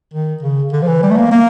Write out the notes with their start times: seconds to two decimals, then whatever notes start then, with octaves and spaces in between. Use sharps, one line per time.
0.14 D#3
0.42 C#3
0.72 D3
0.82 F3
0.87 E3
1.03 G3
1.10 A3
1.17 A#3
1.31 A#3